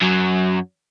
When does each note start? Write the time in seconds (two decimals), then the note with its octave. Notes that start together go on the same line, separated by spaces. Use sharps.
0.01 F#2 F#3